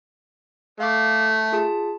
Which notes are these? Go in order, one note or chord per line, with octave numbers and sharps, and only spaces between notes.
A3 F5 D6
F4 G#4 A5